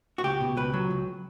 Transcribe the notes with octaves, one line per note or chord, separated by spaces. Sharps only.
F#4
C#2 G4
B2
C#2 B4
F#3
C#2